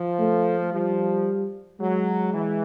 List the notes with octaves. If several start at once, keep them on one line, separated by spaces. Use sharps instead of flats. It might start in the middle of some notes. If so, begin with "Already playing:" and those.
Already playing: F3
A3
F3 G3
F#3 G#3
E3